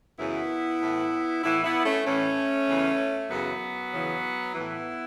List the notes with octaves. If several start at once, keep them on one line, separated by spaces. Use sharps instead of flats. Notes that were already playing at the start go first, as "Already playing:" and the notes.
F#2 C#3 E3 B3 E4
A2 E3
A2 E3 B3 E4
B3 E4
A3 C#4
A2 E3 A3 C#4
E2 C#3 E3
F#2 C#3 E3 F#3 B3
E2 C#3 E3
A2 E3 B3 E4